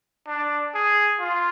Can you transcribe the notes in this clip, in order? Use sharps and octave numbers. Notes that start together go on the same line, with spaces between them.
D4
G#4
F4